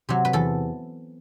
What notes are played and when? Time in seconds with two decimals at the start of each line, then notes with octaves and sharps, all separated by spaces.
0.09 C3 F#3
0.25 B4
0.33 E2 A4